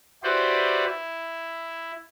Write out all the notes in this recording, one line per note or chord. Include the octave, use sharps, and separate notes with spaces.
E4 F#4 G4 B4 C5 D5
E4